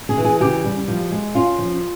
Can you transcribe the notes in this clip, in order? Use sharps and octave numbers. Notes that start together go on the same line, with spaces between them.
G#4
E3
G#4
C#3 G4
G3
F3
G#3
C#4 F4
F3